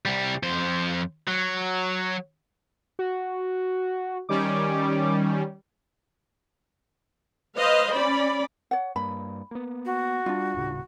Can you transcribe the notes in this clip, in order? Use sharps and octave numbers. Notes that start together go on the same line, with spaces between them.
C2 G3
F2 C5
F#3
F#4
D#3 G3 C#4 D6
B4 C5 D#5 F5
C#4 D5 B5
C#5 F#5
G2 A#3 B5
A#3 B3
F#4
G3 D4 F4
D#1 A2 C#3